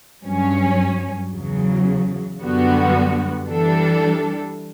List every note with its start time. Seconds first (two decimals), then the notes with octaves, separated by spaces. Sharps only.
0.24 G2 F#3 C#4
1.32 E2 C#3 F#3
2.40 F#2 D3 G3 B3 F#4
3.48 E3 G3 D4 A4